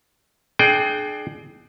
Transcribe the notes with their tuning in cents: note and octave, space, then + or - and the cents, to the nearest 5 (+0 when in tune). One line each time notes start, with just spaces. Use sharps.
D4 +30 G#4 +30 G5 +0